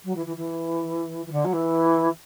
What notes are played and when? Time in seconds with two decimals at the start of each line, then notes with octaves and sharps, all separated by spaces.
0.04 F#3
0.15 E3
0.26 E3
0.36 E3
1.26 E3
1.31 D3
1.44 F#3
1.53 E3